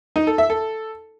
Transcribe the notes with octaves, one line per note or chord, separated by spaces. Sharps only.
D#4
A4
E5
A4